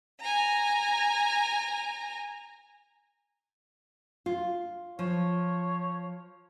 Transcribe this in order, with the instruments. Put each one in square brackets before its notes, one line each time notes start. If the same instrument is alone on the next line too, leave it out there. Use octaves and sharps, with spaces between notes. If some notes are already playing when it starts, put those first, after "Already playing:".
[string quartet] G#5 A#5
[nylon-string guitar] F4
[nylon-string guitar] F3 [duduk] C#5